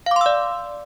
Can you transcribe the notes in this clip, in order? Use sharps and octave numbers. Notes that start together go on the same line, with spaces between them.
D5 F5 C6 D6 E6